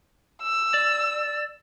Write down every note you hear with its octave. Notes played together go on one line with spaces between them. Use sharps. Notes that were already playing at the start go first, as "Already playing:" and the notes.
E6
D5